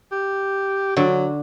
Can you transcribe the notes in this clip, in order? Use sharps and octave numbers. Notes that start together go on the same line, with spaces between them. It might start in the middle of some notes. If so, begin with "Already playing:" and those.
G4
D3 F#3